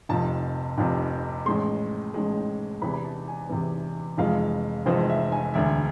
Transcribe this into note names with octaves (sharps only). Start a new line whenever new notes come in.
F1 F2 C3 A5
F1 F2 C3
A1 A2 G#3 C6
A1 A2 G#3
E2 C3 E3 B5
B5
A5
G#5
E2 C3 E3
F1 F2 E3 G#3 F5
F1 F2 E3 G#3 C5
E5
G#5
E1 D2 D3 E5